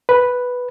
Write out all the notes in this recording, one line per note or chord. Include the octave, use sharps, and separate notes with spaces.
B4